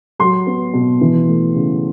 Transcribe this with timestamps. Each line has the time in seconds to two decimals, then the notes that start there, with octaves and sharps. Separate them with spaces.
0.19 F#3 C6
0.47 B3
0.73 B2
1.01 E3
1.28 A3
1.55 C#3